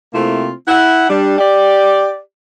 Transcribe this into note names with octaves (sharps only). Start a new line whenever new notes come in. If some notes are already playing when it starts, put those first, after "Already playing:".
C3 A3 A#3 C4 E4 F4
E4 F#5
G3 D4
G4 D5